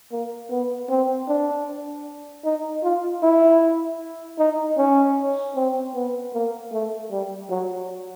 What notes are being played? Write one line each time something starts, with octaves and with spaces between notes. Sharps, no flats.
A#3
B3
C4
D4
D#4
F4
E4
D#4
C#4
C4
B3
A#3
A3
G3
F#3